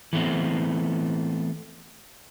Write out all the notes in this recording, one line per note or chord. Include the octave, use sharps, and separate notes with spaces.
E3 A3 B3 C4